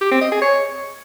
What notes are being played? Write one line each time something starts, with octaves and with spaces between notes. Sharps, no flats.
G4
C4
D#5
G#4
C#5